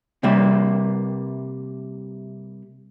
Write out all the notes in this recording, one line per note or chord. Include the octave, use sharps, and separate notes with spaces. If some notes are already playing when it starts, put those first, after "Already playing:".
C3 G3 A#3 E5